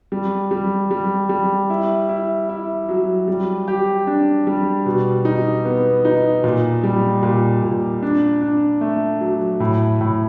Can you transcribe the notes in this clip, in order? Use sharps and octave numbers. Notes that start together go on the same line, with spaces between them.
G3
G3
G3
G3
E4
E4
E4
F#3
G3
G4
D4
G3
B2
D#4
B3
D#4
A#2
G3
A#2
A#2
D4
D4
A3
F#3
A2
A2